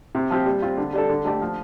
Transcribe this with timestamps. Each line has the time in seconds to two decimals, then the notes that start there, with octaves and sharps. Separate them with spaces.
0.15 C3
0.31 F3 C4 G4
0.46 G3
0.62 C4 F4
0.77 D3
0.93 G3 D4 A4
1.09 D3
1.25 A3 D4 G4 D5
1.41 F3